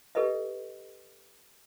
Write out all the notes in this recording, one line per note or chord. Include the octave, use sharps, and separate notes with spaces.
G4 A4 B4 D#5 E5